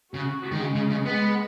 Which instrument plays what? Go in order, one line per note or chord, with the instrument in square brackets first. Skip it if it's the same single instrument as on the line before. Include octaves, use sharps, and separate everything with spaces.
[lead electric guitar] C#3 [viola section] F#4
[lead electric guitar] D#3
[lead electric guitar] C#3 [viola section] G#3
[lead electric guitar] C#3
C#3
B3